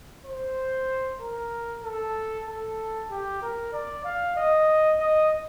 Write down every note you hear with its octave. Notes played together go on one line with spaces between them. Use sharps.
C5
A#4
A4
A4
G4
A#4
D5
F5
D#5
D#5